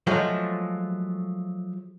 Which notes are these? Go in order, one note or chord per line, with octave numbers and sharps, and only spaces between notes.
F3 F#3 G#3 A3